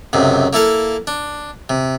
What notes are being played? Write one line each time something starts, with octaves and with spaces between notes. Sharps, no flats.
C#2 F#2 C3
A#3 E4 A4 F5
D4
C3